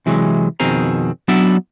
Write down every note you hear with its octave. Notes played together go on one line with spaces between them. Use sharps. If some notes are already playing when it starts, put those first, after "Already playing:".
C3 E3 F#3 G#3
F2 B2 D#3 C4 G#4 A#5
F#3 B3 D4 E4 D5 E5